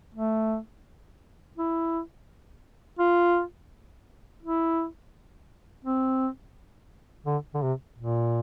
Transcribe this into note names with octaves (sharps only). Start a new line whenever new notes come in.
A3
E4
F4
E4
C4
D3
D3
C3
A#2